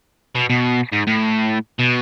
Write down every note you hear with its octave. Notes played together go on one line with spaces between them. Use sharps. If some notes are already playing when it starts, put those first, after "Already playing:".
B2
B2
G#2
A2
B2